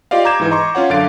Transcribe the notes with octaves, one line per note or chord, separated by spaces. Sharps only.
F4 G4 D5 D#5 F5
A#5 D6 G6 G#6 E7
G#2 E3
D#5 A#5 C6 C#6
C#4 F4 C#5 F#5
F#2 D3 F5 A6 D7